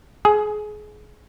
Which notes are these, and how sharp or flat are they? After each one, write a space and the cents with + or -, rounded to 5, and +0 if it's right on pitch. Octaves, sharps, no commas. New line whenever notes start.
G#4 +25